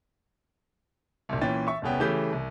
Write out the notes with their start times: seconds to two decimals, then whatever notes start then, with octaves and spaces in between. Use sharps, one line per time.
1.29 E1 C2
1.41 A#2 E3 C#4 G5 A6
1.67 E5 C#6
1.82 E1 C2 C#3 B3 G5
2.00 C#3 E3 A3 G4 G6
2.32 C2